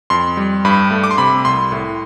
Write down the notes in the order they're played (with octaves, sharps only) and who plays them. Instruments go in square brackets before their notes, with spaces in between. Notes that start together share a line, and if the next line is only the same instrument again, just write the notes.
[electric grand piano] F2 C6
G3
G2 B5
A3
D6
C6
C3 B5
C2 C6
A2